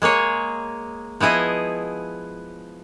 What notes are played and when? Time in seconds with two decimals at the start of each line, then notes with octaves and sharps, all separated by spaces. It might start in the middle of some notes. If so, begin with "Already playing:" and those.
0.02 G#3 A#3 G#4 C#5
1.20 F3 B3 E4 G#4 D#5